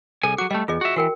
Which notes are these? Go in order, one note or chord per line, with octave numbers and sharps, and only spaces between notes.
C2 G#4 A4 G#5
F#3 F#4 D6
G3 A3 D#5
E2 F4 G#4 D#5
F#4 E5
E3 F#4 A#4 G5